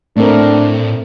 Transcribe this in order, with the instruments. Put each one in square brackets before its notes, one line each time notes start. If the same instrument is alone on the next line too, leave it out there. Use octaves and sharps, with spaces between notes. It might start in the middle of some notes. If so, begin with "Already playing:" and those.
[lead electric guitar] A2 [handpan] A3 C4 A#4 [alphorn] D4